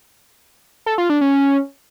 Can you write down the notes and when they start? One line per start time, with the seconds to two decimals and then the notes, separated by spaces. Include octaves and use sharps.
0.86 A4
0.98 F4
1.10 D4
1.21 C#4